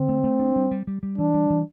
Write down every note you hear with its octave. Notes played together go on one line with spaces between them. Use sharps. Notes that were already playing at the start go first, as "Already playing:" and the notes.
Already playing: D3 C4
A3
A3
D4
G3
G3
G3
G3
E3 D4
G3
E3